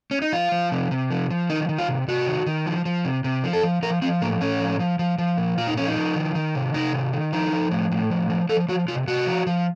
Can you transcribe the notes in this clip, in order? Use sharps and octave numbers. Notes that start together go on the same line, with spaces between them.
C#4
D#4
F3 F4
F3
C3
C3
F3
F3
D#3 D#4
D#3
F4
C3
C3 F#4
D#3
D#3
F3
F3
C3
C3
F3
A4
F3
F3 A#4
F3 C4
A2 A#3
A2 C#4
F3
F3
F3
F3
A#2
A#2 F4
D#4
F3 C#4
D#4
F3
D#3
D#3
C3
C3 D#4
D#3
D#3
F3 D#4
F3
A2
A2
F3
F3
F3 A4
F3 F#4
C3 F4
C3 F#4
F3
F3